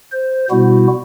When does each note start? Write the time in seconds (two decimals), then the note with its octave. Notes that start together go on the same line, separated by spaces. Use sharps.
0.12 C5
0.51 B2 G3 B3 E4 F#4